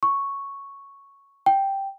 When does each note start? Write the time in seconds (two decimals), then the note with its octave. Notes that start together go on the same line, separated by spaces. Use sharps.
0.03 C#6
1.46 G5